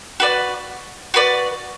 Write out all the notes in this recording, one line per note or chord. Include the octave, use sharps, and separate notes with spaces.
F#4 B4 D5
F#4 B4 D5